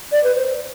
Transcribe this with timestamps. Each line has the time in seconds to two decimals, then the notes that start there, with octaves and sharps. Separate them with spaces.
0.12 D5
0.24 B4
0.36 C5